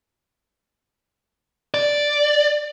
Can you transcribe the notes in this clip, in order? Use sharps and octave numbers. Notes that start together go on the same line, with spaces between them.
D5